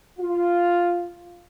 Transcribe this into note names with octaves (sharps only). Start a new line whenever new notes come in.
F4